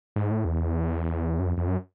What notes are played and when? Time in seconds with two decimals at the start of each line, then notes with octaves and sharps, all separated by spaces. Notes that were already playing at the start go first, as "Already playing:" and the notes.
0.16 G#2
0.31 A2
0.45 E2
1.39 F#2
1.46 F2
1.57 F2
1.68 F#2